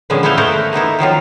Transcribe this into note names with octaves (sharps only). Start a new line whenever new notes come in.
A#2 D3 F3 G#3 B3 C#4
B3 E4 A4 B4 C5 F5
A3 B3 E4 A#4 C5 F#5
A#3 B3 D#4 E4
D#3 F3 F#3 F4